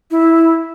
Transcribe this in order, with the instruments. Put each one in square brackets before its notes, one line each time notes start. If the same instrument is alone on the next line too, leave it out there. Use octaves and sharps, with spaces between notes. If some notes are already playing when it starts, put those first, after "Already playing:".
[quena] E4